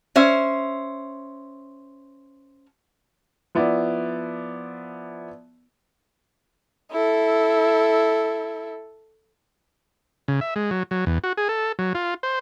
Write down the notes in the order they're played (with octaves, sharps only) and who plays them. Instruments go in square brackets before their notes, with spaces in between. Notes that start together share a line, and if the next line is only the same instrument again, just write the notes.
[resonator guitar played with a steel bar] C#4 C5 E5
[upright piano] F3 B3 E4 D5
[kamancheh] E4 A4
[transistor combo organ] C#3
E5
G#3
F#3
F#3
E2
F#4
G#4
A4
F#3
F4
C5